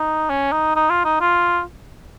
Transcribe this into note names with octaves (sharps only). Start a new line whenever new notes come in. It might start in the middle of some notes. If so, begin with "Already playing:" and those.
Already playing: D#4
C#4
D#4
D#4
F4
D#4
F4